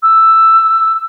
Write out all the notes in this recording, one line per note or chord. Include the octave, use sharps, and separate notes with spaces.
E6